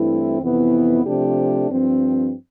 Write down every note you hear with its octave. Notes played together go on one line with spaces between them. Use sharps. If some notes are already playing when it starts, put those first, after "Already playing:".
Already playing: G2 E3 A3 C4 E4
F2 C3 E3 B3 E4
C3 F3 A3 D4 G4
G2 F3 C4